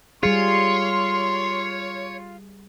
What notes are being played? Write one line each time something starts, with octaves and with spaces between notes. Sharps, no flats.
G3 F4 G#4 C#5 C6